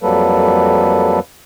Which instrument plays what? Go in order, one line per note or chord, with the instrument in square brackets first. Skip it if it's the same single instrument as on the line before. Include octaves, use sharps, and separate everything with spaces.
[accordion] F2 F#3 G3 A#3 A4 B4